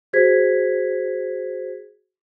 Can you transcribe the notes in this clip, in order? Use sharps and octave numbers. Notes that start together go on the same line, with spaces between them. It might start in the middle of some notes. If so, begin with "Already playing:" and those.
F#4 G#4 C5 G#6 B6